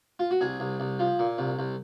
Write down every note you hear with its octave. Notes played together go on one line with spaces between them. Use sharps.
F4
F#4
C2 G#4
C2
C2
F3
A#2
C2
C2